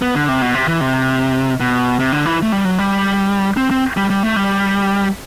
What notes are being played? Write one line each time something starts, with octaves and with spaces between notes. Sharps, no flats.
B3
D3
C3
B2
C3
E3
C3
B2
C3
D3
E3
A3
G3
F#3
G3
C4
C4
G3
G3
A3
G3